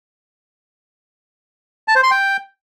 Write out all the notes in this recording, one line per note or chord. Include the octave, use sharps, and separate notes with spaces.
A5
C5
C6
G5